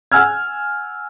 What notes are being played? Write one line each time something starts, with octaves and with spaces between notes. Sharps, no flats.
F#5 G#5 E6 F6 G#6